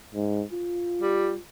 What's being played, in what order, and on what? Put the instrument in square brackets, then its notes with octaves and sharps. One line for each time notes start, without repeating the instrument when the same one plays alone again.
[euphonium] G#2
F4
[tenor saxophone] G3